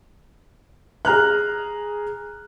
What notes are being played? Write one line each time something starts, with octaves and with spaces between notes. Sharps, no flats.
G#4 A#5 F6 F#6